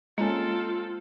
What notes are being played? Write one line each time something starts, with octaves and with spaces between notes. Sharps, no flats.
G#3 A#3 C4 C#4 F4 A4